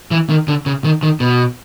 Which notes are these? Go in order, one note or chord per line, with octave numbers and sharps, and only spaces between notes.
E3
D#3
D3
C#3
D#3
D#3
B2